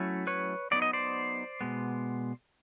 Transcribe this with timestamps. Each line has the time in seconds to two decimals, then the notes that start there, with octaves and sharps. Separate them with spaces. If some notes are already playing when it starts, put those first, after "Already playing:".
Already playing: F#3 A3 C#4 E4
0.27 B4 C#5
0.71 F#3 B3 D#4 D5
0.82 D#5
0.93 C5 D5
1.61 B2 G#3 B3